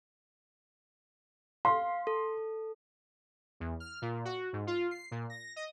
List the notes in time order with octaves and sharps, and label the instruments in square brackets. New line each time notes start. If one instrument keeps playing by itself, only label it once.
[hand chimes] F5 [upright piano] C6
[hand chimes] A4
[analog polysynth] E2
F6
A#2
F#4
G#2
F4
C7
A#2
A#6
D#5